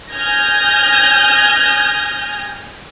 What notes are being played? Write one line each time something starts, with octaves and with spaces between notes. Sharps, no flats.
G#5 D#6 F6 G6 G#6 A#6